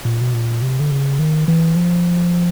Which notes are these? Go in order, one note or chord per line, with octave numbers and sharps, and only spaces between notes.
A#2
B2
A#2
C3
D3
C#3
D#3
E3
F3